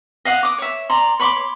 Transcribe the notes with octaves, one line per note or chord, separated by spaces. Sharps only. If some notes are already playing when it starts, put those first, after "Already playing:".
D#5 F5 F#5 D#6
D6 D#6
C#5 E5
D5 A#5 C6
C#5 B5 C6 D6